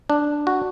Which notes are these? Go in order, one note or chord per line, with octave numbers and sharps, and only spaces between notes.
D4
F#4